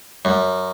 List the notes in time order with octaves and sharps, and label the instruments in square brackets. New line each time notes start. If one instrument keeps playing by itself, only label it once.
[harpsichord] F#2